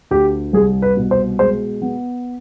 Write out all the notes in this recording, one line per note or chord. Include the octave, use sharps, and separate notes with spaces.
D2 G4
C2 G#4
B4
B2
C5
G#3 C5
B3